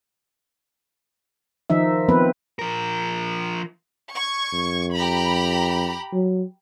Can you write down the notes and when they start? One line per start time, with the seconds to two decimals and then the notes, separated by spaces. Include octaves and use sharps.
1.70 D#3 F3 D#4 E5
2.09 F3 B3 C4 B4
2.59 F3 A#4
4.11 C#6 G#6
4.53 F2
4.94 G4 A#5 B5
6.12 F#3